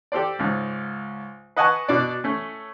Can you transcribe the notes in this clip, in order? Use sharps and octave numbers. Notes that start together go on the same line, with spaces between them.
G4 A4 C5 D5
C#2 G#2
B4 D#5 F#5 G#5 A5 C#6
B2 D4 D5
A3 C#4